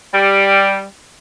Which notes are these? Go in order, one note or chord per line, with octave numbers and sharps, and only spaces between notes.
G3